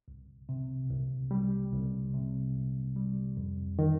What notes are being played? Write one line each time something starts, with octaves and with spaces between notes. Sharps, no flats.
C2
C3
C2
G3
C2
C3
C2
G3
F2
D#3